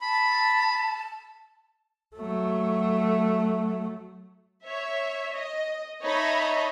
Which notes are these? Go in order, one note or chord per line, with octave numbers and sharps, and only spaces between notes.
A5 B5
F#3 A3
C#5 E5
D#5
D#4 C#5 D#5 E5 A5 B5